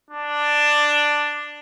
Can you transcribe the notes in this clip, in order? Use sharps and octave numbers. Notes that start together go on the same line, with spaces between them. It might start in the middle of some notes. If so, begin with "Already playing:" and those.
D4